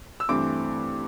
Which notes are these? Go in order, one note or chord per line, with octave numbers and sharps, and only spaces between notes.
E6
G2 E3 A3 C4 D6